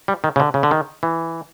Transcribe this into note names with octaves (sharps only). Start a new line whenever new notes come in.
G3
D#3
C#3
D3
C#3
D3
D#3
E3